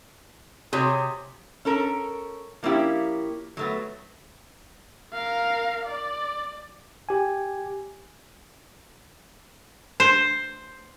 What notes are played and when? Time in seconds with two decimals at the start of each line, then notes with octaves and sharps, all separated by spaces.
0.73 C3 F4 F#4 G#4 C#5
1.65 C#4 A4 A#4
2.63 F3 A#3 C#4 E4 G4
3.57 F#3 A3 B3
5.13 A#4 F5
5.86 D5
7.09 G4 G#5
10.00 C5